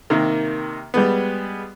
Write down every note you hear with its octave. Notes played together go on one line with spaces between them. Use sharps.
C3 D#3 A#3
G3 G#3 B3